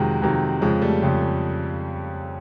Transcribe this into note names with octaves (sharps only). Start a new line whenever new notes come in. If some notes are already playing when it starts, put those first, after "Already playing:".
Already playing: F2 C3 D#3 F#3 G#3
F2 C3 D#3 F#3
F2 C#3 F3 G#3
G3 A3
F2 C#3 F3